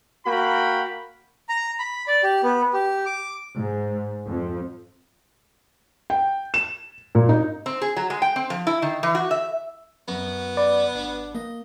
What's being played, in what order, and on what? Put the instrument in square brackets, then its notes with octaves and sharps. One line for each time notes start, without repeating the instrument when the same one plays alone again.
[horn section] A#3 F#4 G5 B5
[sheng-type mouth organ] A#5
B5
D5
G4
B3
G4
D6
[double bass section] G#2
F2
[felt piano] G5
E7
A#2
D#4
[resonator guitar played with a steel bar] C4
G#4
F#3
G#3
G5
C4
F3
E4
D#3
E3
F#4
E5
[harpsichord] F#2 [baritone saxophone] B3
[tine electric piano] D5 B5
[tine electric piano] G#1 [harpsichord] D4
[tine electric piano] A#3 [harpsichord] D#5